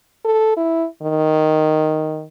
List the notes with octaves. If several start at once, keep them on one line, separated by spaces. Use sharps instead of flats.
A4
E4
D#3